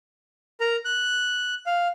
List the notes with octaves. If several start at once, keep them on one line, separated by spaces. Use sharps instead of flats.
A#4 A#5
F#6
F5